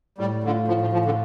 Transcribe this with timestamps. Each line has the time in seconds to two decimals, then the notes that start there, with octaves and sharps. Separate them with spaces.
0.18 A2 G3
0.44 D3 A3 F4
0.68 A2 F3
0.81 F3
0.93 F3 A3 F4
1.05 D3